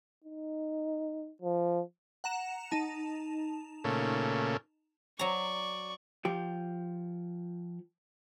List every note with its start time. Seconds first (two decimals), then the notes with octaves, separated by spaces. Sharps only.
0.25 D#4
1.42 F3
2.24 F#5 A#5 E7
2.71 D#4 A5
3.84 A#2 C#3 A3
5.19 F#3 D5 A#5 C#6
6.25 F3 G4